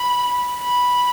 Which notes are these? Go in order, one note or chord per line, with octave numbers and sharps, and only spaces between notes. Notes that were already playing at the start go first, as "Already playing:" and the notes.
Already playing: B5
B5